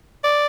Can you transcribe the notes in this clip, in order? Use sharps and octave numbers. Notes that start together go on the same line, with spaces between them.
D5